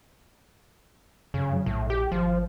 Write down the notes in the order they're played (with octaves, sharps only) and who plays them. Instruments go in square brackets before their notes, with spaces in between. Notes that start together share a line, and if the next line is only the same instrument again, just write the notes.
[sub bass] F#2 [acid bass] C#3
[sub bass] F#3
[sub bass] A#1 [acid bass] A2
[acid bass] G4
[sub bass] G#1 [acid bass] F3